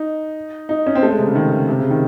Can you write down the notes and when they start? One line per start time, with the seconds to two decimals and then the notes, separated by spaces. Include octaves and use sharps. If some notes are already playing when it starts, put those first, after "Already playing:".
Already playing: D#4
0.69 D#4
0.86 C#4
0.95 C4
1.03 A3
1.10 G#3
1.19 C3
1.27 C#3
1.35 D#3
1.51 C#3
1.68 C3
1.79 C#3
1.91 D#3